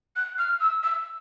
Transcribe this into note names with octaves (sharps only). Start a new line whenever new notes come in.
F#6
F6
E6
E6